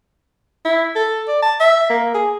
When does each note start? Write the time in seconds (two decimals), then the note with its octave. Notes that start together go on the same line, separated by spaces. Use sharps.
0.65 E4
0.95 A4
1.28 D5
1.43 A5
1.60 E5
1.90 A#3
2.14 G#4